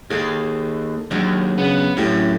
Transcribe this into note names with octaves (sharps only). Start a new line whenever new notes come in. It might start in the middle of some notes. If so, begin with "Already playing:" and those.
D#2 G#4 A4 F5
D#2 F#3 G#3 D4
C#3 B3
F#2 A2 C#4 D4 G4